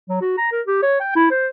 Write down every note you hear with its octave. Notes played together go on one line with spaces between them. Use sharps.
F#3
F#4
A#5
A#4
G4
C#5
G5
E4
C5